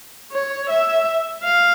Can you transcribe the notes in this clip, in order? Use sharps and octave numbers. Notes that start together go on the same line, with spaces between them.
C#5
E5
F5